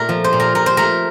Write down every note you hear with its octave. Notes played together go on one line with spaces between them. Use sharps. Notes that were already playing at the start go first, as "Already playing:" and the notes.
Already playing: A#2 A3 A#4
F3
C5
A#2
A#4
A#2 A#4
C5
A3 A#4